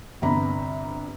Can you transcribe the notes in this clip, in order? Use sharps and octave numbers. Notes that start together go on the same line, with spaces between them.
G1 G2 C3 A#5 B5